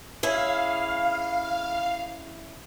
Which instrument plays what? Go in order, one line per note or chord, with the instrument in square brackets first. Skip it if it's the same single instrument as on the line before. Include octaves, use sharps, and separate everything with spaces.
[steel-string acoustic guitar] C#4 E4 G#4 [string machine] F5